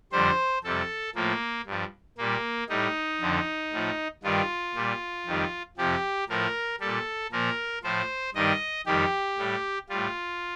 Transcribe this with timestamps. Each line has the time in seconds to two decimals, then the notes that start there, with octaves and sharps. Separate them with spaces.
0.12 F2 D3 G3 C5
0.64 F2 C3 G3 A4
1.15 A2 F3 A#3
1.66 G2 F3
2.18 A#2 G3 A#3
2.69 A2 G3 D#4
3.21 F2 D3 F3
3.72 A2 F3
4.23 G2 D#3 G3 F4
4.75 A#2 G3
5.26 F2 D#3 G3
5.77 F2 C3 F3 G4
6.29 A2 F3 A#4
6.80 A#2 G3 A4
7.32 A#2 F3 A#4
7.83 A2 F3 C5
8.34 G2 D#3 G3 D#5
8.86 F2 D#3 G3 G4
9.38 A2 G3
9.89 A2 G3 F4